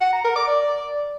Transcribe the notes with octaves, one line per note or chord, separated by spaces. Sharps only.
F#5
A#5
A#4
D6
D5